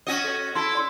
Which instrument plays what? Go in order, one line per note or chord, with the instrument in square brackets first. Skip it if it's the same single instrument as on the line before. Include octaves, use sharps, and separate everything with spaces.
[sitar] C#4 F#4 D#5
[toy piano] A4 C#5
[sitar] E4 A4 [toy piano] C6
[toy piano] D5 C6 E6